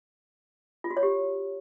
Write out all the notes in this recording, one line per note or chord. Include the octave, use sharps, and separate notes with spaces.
F4
F#4
C#5
G4